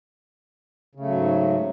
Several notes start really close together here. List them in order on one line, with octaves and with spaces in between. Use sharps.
C#3 A3 F#3 G#2